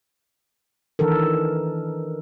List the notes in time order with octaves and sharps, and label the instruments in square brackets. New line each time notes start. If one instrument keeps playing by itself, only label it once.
[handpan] D#3 E3 D4 A4 A#4